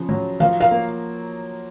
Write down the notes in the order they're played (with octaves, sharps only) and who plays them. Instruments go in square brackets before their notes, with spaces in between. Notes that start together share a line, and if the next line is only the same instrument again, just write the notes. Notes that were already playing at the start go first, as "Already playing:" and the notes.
Already playing: [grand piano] C#3 F3
F#3
[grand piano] F3 [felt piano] F5
[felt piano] F5
[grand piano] A#3